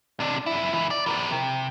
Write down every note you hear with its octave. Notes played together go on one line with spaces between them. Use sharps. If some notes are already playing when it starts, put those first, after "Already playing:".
C3 D4
F#2 E4
C#2 E3
D5
E3 A#4
C3